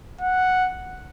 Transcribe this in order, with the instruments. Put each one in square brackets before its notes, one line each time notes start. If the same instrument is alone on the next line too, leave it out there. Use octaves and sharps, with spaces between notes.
[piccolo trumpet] F#5